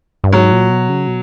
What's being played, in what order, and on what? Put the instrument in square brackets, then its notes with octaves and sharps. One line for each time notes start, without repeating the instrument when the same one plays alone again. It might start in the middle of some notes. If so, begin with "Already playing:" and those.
[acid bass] G2
[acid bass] G#2 [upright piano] F#3
[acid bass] A#2
B2
C#3
B2